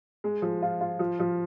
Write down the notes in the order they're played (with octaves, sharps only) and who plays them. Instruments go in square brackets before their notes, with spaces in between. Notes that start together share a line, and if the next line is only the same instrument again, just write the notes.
[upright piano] G#3
F3
F4
F4
F3
F3